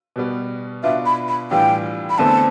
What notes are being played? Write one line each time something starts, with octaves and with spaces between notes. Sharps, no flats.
B2 G3 B3
B2 B3 D4 F4 E5
B5
B5
A2 E3 G3 D4 F4 G5
B5
E2 D3 A3 C4 A5